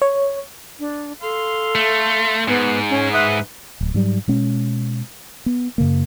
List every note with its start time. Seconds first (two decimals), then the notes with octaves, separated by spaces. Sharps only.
0.02 C#5
0.80 D4
1.22 A4 F5 C6
1.75 A3
2.48 G#2 B3
2.90 C#4
3.13 B4 E5 F#5 D#6
3.81 D1
3.94 G#2 F#3 G3
4.28 B2 G#3 C#4
5.46 B3
5.78 F#2 C#3 A#3